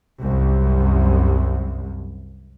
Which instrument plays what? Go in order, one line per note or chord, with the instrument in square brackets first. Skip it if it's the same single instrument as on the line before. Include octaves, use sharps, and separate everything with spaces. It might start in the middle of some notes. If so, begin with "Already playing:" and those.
[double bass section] C2 F#2